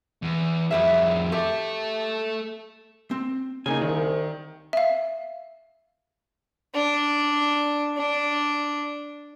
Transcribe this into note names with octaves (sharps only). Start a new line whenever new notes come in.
E2
F2 F#3 G3 G#4 E5
A3 G4 A4 E5
C4
C#3 A#3 D#4 G#5
C2 D#3
E5 F5
D4
D4